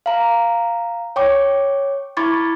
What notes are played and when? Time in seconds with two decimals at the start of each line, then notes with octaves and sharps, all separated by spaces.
0.06 F5 A#5
1.16 C#5 G5 C#6 D6
2.17 E4 B5 C#6 D6 G#6 A6